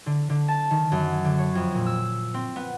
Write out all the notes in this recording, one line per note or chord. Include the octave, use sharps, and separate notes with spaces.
D3
D3
A5
D#3
F#2
D3
C#5
F2
A#2
E6
C4
B3